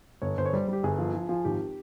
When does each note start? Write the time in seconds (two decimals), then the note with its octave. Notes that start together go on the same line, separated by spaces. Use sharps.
0.22 G1 C#5
0.38 G1 C5
0.46 C#5
0.53 G3 C5
0.68 G3 G4
0.83 G1 G#4
0.99 F3
1.13 F3
1.29 F3 F4
1.45 G#1 G4